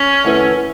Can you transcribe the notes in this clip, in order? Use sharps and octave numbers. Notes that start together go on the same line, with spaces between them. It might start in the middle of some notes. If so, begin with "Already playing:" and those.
Already playing: C#4
E2 D3 A3 E4 B4